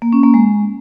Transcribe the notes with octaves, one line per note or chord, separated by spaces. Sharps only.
A#3
C#4
A#3
G#3